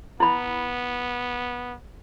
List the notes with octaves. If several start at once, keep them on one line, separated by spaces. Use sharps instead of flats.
B3 E4 B5